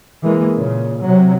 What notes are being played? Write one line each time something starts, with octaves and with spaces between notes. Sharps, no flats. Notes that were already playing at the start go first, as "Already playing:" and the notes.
E3 G#3 A#3
A#2 C#3
C3 F#3